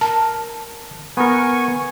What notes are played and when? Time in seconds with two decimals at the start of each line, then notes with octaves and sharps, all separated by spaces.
0.01 A#4 A5
1.17 B3 A#4 G#5 C#6